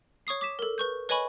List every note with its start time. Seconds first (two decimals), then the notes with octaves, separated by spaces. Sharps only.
0.27 C#5 C#6 D#6 C7
0.41 D6 B6 E7
0.59 A4 A#4
0.78 B4 C#6 G6
1.09 B4 C#5 D#5 G#5 B5 C#6